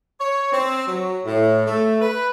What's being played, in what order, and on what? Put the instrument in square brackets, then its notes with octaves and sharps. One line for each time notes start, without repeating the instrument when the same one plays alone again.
[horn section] C#5
C4
F#3
A2
A3
B4